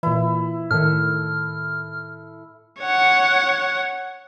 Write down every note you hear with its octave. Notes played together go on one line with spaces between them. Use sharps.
A#2 E3 E4
A2 D#3 A4 F6
C#5 F#5